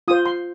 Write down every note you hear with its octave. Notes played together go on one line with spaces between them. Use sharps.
F4 C5 D#6
C6